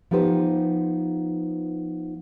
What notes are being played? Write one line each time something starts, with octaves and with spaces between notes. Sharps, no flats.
F3 B3 D#4 G4 B4 C5